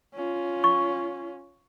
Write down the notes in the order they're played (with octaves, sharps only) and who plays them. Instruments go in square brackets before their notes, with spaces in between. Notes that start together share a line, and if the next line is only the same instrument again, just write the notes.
[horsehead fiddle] C#4 F4
[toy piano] C#6